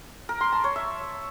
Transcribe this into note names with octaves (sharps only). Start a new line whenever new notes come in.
A#4
C6
A5
C#5
E5